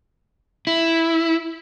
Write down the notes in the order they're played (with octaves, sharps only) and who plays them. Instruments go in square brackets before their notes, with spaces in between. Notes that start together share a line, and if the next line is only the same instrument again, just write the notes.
[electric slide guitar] E4